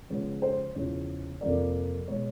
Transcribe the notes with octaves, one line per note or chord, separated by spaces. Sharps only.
C#3 F3 G#3 B3 C#5
C5
E2 C#3 F3 C#5
F2 C3 F3 A#3 D5
B2 G#3 C#5